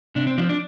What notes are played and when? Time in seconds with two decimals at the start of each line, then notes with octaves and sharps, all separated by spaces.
0.15 C3 D4
0.27 C4
0.38 F3 D4
0.42 C4
0.49 D4